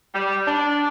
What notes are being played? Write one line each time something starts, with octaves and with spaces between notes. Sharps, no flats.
G3
D4